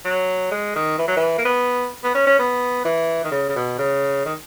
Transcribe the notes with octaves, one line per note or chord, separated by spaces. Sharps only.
F#3
G#3
D#3
E3
F#3
E3
A#3
B3
B3
C#4
C#4
B3
E3
D#3
C#3
C#3
B2
C#3
D#3